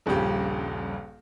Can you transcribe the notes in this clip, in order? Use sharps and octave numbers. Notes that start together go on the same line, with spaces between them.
D#1 A#1 G2 C#3 G4